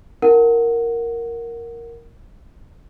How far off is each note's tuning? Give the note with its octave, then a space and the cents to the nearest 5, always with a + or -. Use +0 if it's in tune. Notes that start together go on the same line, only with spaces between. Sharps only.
E4 -20 A#4 +0 F#5 +0